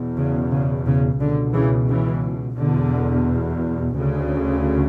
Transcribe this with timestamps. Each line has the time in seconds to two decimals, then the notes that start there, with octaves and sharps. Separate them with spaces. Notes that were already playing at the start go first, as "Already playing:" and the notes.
Already playing: E2 B2
0.17 C#3
0.52 C#3
0.86 C#3
1.20 C#2 B2 D3
1.54 C#3 E3
1.88 C#3 E3
2.58 E2 B2 D3
3.94 D2 C#3